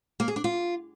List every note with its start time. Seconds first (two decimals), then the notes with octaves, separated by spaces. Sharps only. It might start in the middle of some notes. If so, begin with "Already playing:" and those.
0.20 A#3
0.28 G#4
0.36 D4
0.44 F4